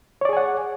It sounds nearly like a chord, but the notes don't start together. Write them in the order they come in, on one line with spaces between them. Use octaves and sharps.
C#5 D5 G#4 G#5 F#5